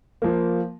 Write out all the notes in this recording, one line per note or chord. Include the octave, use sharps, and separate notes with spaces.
F3 A#3